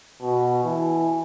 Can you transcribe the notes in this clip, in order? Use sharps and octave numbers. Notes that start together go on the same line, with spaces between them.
B2
E3